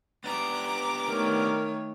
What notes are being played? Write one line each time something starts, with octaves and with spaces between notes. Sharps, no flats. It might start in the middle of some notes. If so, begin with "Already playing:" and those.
B3 D4 G4 A#5 D6
D#3 A3 A#4 C#5